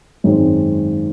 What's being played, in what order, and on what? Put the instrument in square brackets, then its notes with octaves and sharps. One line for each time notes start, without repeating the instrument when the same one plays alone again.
[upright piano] G#1 F#2 D#3 G#3 C4